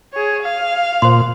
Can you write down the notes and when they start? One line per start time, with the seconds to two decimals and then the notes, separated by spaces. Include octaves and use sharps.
0.13 G#4 C#5
0.42 F5
1.02 A#2 C5 C6